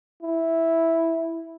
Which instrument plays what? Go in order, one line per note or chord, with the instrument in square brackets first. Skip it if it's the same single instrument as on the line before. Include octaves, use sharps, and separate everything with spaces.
[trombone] E4